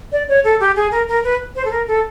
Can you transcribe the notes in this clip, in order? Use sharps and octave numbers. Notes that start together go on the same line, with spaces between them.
D5
C#5
A4
G4
G#4
A#4
A#4
B4
C5
A4
A#4
A4